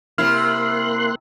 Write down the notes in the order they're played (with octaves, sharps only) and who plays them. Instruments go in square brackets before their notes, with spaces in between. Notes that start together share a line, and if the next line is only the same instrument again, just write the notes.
[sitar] C3 E4 [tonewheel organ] A#3 C6 F#6 [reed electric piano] F6